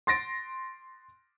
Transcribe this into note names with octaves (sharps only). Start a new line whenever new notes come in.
C6 A6 A#6 D7